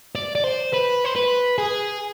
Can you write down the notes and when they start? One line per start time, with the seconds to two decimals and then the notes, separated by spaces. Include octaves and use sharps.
0.15 D5
0.35 D5
0.44 C5
0.73 B4
1.04 C5
1.15 B4
1.58 G#4